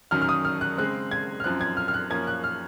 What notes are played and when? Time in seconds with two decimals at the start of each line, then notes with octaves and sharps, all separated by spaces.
0.11 F#2 D#3 F#3 C#4 F6
0.22 F6
0.29 D#6
0.45 F6
0.61 F#6
0.78 C#3 G#3 C4 F#6
1.11 G#6
1.40 F6
1.44 F#2 F3 C4 F#6
1.61 G#6
1.77 F6
1.88 F6
1.94 F#6
2.10 F#2 F3 A#3 C#4 G#6
2.27 F#6
2.44 F6